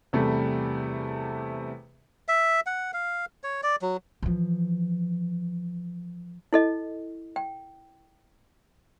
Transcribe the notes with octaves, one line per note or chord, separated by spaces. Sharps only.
E2 C3 G3 A3
E5
F#5
F5
C#5
D5
F#3
E3 F3
E4 A4 D#5
G5